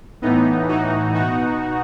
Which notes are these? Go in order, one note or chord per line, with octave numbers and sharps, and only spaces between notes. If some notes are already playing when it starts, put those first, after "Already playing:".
A2 E3 B3 D#4
A2 E3 D#4 F#4
B2 D#4 F#4